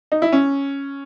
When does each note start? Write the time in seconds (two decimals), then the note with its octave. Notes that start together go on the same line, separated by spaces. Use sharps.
0.12 D#4
0.22 E4
0.32 C#4